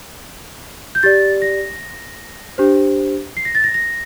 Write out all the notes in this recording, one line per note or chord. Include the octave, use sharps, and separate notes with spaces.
G6
G4 D5 A6
A#6
D4 G4 C5
C7
A#6
A6
A#6
A#6